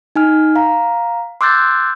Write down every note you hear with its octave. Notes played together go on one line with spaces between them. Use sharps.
D#4 G#5 F6
F5 A#5
C6 D6 E6 F#6 G6 A6